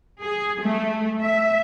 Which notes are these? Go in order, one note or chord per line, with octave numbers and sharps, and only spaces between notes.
G#4
A3
E5